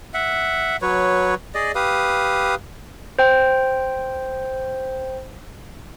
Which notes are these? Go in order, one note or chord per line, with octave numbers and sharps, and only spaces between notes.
E5 F#5
F#3 B4 C#5
G#4 D5 D#5
G4 B4 F5 D#6
C5 G5